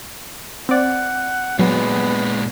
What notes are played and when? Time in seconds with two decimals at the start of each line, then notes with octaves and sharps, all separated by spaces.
0.69 C4 D5 F#5
1.59 A#2 F#3 G#3 B3